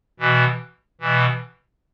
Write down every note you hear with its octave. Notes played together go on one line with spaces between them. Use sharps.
B2 E3
B2 E3